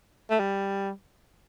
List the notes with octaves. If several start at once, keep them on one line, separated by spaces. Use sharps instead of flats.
A3
G3